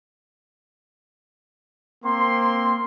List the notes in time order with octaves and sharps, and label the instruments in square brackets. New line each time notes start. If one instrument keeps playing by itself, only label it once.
[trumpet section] A#3 C4 C6